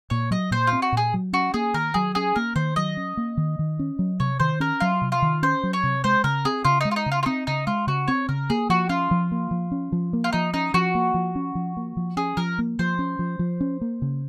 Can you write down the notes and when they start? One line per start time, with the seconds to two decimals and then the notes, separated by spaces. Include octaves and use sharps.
0.10 A#2 C#5
0.31 F#3 D#5
0.51 A#2 C5
0.67 F4
0.72 C4
0.82 F#4
0.92 A#2 G#4
1.14 F#3
1.33 C#4 F#4
1.54 A#3 G#4
1.74 D#3 A#4
1.94 F#3 G#4
2.15 C#4 G#4
2.36 A#3 A#4
2.56 D#3 C5
2.76 F#3 D#5
2.97 C#4
3.17 A#3
3.37 D#3
3.59 D#3
3.79 C#4
3.99 F#3
4.20 C3 C#5
4.40 D#3 C5
4.60 C#4 A#4
4.80 F#3 F4
5.02 C3
5.12 F4
5.22 D#3
5.43 C#4 C5
5.63 F#3
5.73 C#5
5.83 C3
6.04 G#3 C5
6.24 C#3 A#4
6.45 C4 G#4
6.65 C#3 F4
6.81 G#3 D#4
6.91 F4
6.96 D#4
7.06 C#3
7.12 F4
7.23 F4
7.26 C4 D#4
7.47 C#3 D#4
7.67 G#3 F4
7.87 C#3 F#4
8.08 C4 C#5
8.29 C#3 A#4
8.50 A#3 G#4
8.69 F3 F#4
8.89 C#4 F4
9.11 F3
9.31 A#3
9.51 F3
9.72 C#4
9.92 F3
10.13 A#3
10.24 F4
10.33 F3 D#4
10.54 C#4 D#4
10.74 F3 F#4
10.95 A#3
11.14 F3
11.35 C#4
11.55 F3
11.77 A#3
11.97 F3
12.17 C#4 G#4
12.37 F3 A#4
12.59 A#3
12.79 F3 C5
12.99 C#4
13.19 F3
13.39 F3
13.61 C#4
13.81 A#3
14.02 C#3